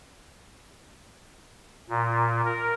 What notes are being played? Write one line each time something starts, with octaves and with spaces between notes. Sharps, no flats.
A#2
A#4